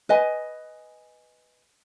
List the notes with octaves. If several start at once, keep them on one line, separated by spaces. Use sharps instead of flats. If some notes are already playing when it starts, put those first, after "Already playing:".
B4 D#5 G#5